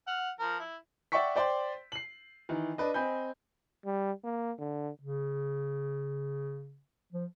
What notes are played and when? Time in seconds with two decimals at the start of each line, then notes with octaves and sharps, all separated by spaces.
0.07 F#5 F6
0.39 F3 A#4
0.59 E4
1.12 D5 E5 F#5 G5 C#6 B6
1.36 C5 D5 G5 C6
1.92 C7 F#7
2.49 D#3 E3
2.78 D4 B4 D#5
2.94 C4 D#5 G#5 B5 G6
3.85 G3
4.24 A#3
4.59 D3
5.01 C#3
7.12 F3